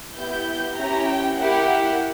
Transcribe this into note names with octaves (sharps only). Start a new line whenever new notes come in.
B3 E4 G4 G6
C#4 E4 G4 A#5
G5
A#3 E4 G4 F#5